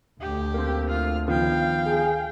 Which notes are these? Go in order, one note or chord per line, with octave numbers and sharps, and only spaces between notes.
D2 G4
A#3 C4
F4 F6
D#3 F3 B3 F5 G5
G#4